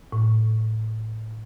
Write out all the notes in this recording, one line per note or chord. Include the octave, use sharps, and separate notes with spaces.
A2